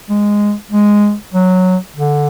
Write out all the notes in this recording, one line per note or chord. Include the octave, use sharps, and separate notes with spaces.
G#3
G#3
F#3
D3